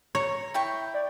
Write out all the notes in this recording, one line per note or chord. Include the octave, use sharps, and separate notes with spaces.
C#5 A#5
E4 G5 C#6 G6
D5